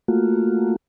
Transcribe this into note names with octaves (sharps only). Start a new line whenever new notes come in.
A3 A#3 F4 F#4